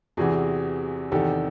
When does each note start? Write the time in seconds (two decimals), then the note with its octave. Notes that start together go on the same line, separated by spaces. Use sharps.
0.17 E2 C3 E3 F#4 G#4
1.11 E2 C3 D#3 G4 A4